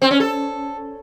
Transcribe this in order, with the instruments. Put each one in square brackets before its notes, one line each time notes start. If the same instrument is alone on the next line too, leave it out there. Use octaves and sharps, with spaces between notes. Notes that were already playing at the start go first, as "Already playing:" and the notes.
[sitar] C4
C#4
A4